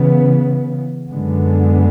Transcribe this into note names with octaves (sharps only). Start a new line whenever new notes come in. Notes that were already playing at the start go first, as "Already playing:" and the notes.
Already playing: C#3 E3 B3
F#2 D3 G#3 B3